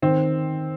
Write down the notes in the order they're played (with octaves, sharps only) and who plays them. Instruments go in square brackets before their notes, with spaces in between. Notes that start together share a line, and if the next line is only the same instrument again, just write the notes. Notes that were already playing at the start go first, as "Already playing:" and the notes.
[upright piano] D#3 [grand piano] C4